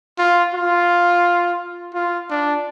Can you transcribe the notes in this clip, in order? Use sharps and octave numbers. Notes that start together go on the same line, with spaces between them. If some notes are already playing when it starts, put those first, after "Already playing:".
F4
F4
F4
D4